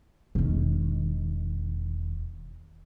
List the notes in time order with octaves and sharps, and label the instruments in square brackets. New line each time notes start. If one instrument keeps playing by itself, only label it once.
[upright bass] E1 D#3